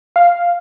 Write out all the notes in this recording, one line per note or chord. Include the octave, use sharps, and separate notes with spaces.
F5